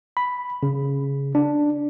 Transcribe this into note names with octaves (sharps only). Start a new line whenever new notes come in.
B5
C#3
D4